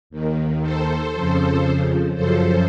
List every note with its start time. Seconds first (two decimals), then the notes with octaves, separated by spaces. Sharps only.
0.10 D#2 D#3
0.61 A4 C5
1.14 F2 C#3 F3
2.15 F#2 C#3 F3 A4 C5